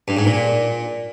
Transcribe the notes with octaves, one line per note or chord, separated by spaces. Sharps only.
G2
G#2
A#2